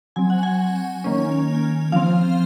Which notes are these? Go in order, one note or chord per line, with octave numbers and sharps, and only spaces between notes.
F#3 C4 G#5
F#5
G#5
D#3 A#3 C#4
F3 C4 F5